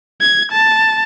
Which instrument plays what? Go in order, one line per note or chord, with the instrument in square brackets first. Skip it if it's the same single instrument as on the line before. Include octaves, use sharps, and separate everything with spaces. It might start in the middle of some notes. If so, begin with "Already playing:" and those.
[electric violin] G#6
A5